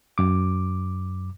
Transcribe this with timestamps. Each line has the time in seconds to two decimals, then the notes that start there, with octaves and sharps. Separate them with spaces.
0.18 F#2 D6